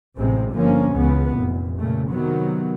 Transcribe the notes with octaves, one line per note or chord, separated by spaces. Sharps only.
A1 C3 G#3 C4
G1 D3 F3 A#3 C#4
C#2 C#3 E3 B3
F1 A#2
A#2 C#3 A3
C3 D#3 F#3 B3